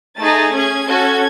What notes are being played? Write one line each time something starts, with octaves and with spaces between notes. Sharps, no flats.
A3 D#4 G#4 A6
C#4 G#4 G#6
C#4 F#4 A4